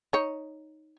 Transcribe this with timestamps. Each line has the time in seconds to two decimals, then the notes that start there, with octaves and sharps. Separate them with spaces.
0.13 D#4 C#5